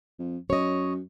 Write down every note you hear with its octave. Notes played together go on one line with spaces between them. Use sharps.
F2
F#2 C#5 D#5